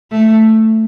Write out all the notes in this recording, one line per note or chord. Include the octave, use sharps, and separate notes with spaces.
A3